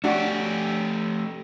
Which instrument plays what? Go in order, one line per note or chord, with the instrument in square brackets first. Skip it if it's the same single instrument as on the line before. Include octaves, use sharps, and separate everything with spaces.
[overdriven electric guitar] A3 G4 [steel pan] D4 F#4